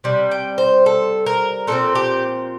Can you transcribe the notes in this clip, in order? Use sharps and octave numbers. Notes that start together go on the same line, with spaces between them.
C3 G3
G5
C5
A4
A#4
A#2 F3 C4 A4
G4